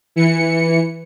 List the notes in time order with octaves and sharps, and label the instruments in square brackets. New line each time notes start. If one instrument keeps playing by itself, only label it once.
[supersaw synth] E3 C#7